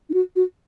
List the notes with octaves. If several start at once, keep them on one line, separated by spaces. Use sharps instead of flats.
D#4
F#4
F#4